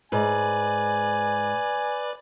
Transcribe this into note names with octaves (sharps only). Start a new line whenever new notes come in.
G#2 B4 D5 G#5